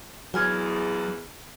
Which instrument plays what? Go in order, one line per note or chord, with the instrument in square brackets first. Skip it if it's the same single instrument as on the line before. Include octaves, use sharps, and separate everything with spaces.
[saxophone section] E2 G#2 [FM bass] F#3 [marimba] G#5 F6 G#6